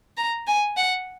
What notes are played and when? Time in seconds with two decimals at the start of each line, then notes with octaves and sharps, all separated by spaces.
0.17 A#5
0.48 G#5
0.77 F#5